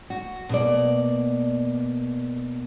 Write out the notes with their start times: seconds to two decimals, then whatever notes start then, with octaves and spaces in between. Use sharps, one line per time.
0.10 F#4
0.49 B2 A#3 D5